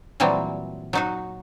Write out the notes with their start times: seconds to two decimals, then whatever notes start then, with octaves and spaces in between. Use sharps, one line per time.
0.20 A#2 E3 F#3 G3 C4
0.93 F#3 D#4 F#4